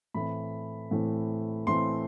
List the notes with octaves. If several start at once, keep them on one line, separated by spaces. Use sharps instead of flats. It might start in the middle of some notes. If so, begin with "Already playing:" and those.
A2 E3 A3 C4 B5
A2 E3 A3 C4
A2 E3 A3 C4 C6